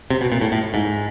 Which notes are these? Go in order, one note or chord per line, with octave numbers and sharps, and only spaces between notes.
C3
B2
A#2
A2
A2
G#2